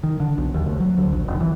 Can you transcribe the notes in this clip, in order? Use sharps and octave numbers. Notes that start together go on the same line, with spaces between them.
D#3
D3
B1
D#2
D2
F#3
D2
A#1
F1
E3